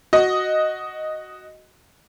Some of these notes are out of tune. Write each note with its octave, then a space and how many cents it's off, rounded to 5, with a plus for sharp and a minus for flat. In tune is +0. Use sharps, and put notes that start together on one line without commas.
F#4 +0 D#5 +0